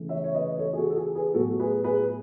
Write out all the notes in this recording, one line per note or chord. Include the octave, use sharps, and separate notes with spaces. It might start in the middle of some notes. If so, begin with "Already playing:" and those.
Already playing: C#3 E3 A3
C#5 E5
C#5
B4 D#5
A4 C#5
G#4
F#4 A4
A4
G#4
G#4 B4
A2 F#3 B3 F#4 A4
G#4 B4
G#4 B4